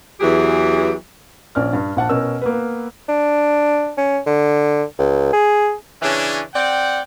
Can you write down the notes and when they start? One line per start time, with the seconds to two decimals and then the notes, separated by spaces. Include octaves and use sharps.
0.21 E2 E3 F#3 G4 G#4
1.55 A#1 C#4 D5 F6
1.73 G2
1.96 A#1 F#5 A5
2.09 B2 C#4 A#4 E6
2.41 A#3 B3 B4
3.09 D4
3.98 C#4
4.26 D3
4.99 C#2
5.33 G#4
6.02 C#3 E3 C#4 D4
6.54 C4 D5 F#5 G5